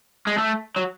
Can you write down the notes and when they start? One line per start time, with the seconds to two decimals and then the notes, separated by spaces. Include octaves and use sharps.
0.27 G#3
0.38 A3
0.77 F#3